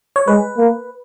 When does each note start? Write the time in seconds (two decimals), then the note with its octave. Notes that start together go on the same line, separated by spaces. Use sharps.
0.16 C#5
0.27 G#3 B4
0.58 A#3